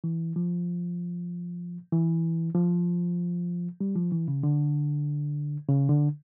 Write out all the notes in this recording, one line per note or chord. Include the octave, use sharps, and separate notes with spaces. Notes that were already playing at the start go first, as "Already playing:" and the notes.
E3
F3
E3
F3
G3
F3
E3
C#3
D3
C#3
D3